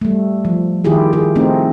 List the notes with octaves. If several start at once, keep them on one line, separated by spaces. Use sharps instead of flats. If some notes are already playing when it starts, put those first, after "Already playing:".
G3 A3
F3
D#3 E4 F4 G4 G#4
G#4
A3 C4 D#4